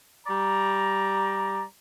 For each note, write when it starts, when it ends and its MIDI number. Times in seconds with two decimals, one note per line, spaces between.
0.27 1.63 55
0.27 1.63 74
0.27 1.63 82